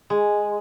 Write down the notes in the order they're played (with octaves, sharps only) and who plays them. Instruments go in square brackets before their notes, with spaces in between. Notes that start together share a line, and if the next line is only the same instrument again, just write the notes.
[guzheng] G#3